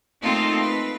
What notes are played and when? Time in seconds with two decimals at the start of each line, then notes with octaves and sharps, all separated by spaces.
0.22 A3 A#3 C4 D#4 F4 A4
0.59 B4